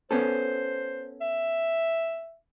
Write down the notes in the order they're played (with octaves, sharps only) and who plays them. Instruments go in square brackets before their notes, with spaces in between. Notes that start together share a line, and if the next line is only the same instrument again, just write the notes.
[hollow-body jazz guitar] B3 C#4 A4 [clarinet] C5
[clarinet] E5